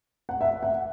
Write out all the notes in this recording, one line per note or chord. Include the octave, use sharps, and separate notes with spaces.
F#5
E5
F#5